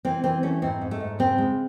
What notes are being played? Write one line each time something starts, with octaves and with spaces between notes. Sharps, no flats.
E3 C4
E3 C4
A3 C#4
G#2 C4
G#2
A3
G#2
C#3 C4
G#3